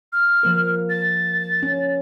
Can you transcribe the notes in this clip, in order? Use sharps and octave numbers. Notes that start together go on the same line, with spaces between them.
F6
F3 A#3 A#4
A6
C#4